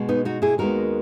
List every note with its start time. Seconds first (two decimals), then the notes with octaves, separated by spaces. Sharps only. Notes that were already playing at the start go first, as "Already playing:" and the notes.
Already playing: B2 G#3
0.09 B3 D#4
0.25 D#4 F#4
0.42 E4 G#4
0.58 D#2 D#3 G#3 B3 F#4 A#4